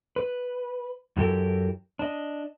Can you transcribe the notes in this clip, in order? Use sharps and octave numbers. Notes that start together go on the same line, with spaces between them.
B4
F#2 E3 F#3 G4 A4 A#4
D4 D#5